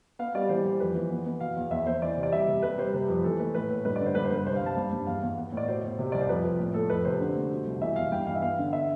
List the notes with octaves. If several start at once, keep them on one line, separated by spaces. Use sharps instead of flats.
B3 F5
G3 D5
E3 C5
E3
F2 B4
E3
B3
B3
B2 F5
E2
E2 E5
E2 C5
E3 D5
C3
D5
G3 E5
C3
G3 B4
G3 C5
C3 B4
F2
E3 A4
A3 B4
A2 B4
A2
G2 B4
D5
D3
C5
G2 B4
C5
G2 B4
C2 C5
F5
C2 A5
G2
G2
E2 F5
E2
B3
A2
D5
B2 C5
B2
C3
C2 D5
C5
F2 B4
F2
A2
A3 A4
F2 B4
C3 C5
D3
A3
B2
C2
E3 E5
E2 F5
G2 G5
E3 F5
E5
B3 F5
D3
E5